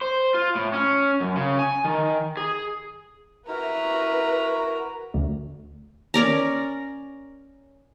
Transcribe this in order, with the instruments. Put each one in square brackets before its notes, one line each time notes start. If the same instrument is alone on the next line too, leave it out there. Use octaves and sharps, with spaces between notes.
[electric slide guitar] C5
F4
A2
C#4
F#2
C#3
G#5
D#3
G#4
[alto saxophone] E4 [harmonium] F#4 A#4 [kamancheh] B4 [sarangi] A#5
[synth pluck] D2
[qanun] C#4 A#4 D5 A#5